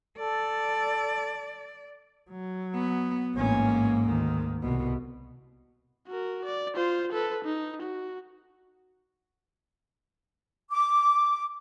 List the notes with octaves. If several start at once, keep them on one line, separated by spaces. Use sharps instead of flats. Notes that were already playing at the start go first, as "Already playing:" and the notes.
A4 D5
F#3
B3
A1 G#2 A#3 C#4
D2 D#3
C2 B2
F#4 A#4
D5
F4 C5
A4 B4
D#4
F#4
D6